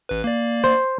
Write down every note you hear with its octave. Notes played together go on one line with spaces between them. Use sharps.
A1 B4
A#3 D5
C5